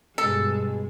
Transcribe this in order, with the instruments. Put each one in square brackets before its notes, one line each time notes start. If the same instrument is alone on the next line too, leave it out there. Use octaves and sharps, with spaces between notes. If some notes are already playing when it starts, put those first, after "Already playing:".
[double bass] G2 B2 [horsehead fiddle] G#3 [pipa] A4